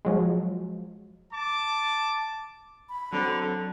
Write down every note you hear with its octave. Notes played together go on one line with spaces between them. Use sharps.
F3 F#3 G#3
A5 D6
B5
D3 F#3 C4 A4
D3